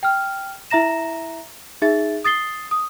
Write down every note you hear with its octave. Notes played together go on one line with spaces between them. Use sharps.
G5 F6
E4 E5 A#5 A#6 E7
D#4 G#4 E5 A6
D#6 A6 C7 G7
D#6